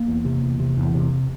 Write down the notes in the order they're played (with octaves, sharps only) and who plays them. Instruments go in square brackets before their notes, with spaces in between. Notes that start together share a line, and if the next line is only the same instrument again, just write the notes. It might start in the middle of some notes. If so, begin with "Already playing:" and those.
Already playing: [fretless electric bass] A#3
E2
C3
E2
C3
E2
C3